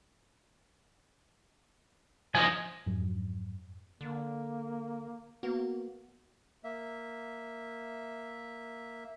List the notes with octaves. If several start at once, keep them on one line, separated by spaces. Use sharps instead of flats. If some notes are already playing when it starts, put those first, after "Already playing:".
F3 D#4 G#5
F2 G#2 F#3
D3 A#3
A#3 B3 F#4
A#3 E5